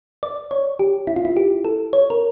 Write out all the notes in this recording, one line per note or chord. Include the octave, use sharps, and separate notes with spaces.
D5
C#5
G4
E4
F4
E4
G4
A4
C#5
A#4